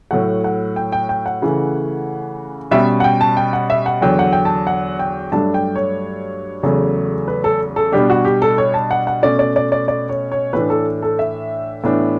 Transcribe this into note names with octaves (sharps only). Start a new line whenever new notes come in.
A2 F#3 A3 F#5
F#5
G5
G5
G5
F#5
C#3 E3 A3
B2 G3 C#4 E5
F#5
G5
A5
G5
F#5
E5
F#5
E2 D3 F#3 G5
F#5
G5
A5
F#5
G5
G2 F#3 A3 D4 A5
G5
C#5
E2 C#3 F#3 A3
B4
A4
A4
B2 G3 D4 G4
F#4
G4
A4
C#5
A5
F#5
F#5
B2 A3 C#4 D5
D5
D5
D5
D5
C#5
C#5
A2 E3 A3 D4 B4
A4
A4
E5
A2 E3 B3 D4